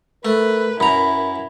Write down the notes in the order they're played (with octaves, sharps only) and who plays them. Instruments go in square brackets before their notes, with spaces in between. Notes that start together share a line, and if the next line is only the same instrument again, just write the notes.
[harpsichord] A3 [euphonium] A#4 [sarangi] B4
[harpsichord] F#2 A#5 [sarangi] E4 [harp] B5